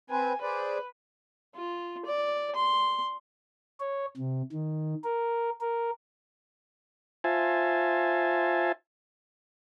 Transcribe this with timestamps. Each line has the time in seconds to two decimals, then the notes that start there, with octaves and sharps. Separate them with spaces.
0.10 C4 B4 C5 G#5
0.42 G#4 B4 C5 D5
1.55 F4
2.05 D5
2.56 C6
3.80 C#5
4.17 C3
4.52 D#3
5.04 A#4
5.61 A#4
7.24 F4 C5 E5 G#5 A5